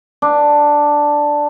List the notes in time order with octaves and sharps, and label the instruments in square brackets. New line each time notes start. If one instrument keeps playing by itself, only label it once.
[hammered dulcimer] D4